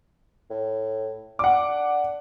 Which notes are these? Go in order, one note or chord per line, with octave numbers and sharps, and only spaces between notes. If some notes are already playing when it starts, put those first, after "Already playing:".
A2
D4 F#5 D6